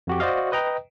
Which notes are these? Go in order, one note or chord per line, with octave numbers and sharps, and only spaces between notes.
F2 F#4 G4
F#4 C5 D5 D#5 F5
B4 D#5 G5 A#5